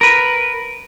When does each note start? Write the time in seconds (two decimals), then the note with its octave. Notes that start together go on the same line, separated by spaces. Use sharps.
0.01 A#4 B4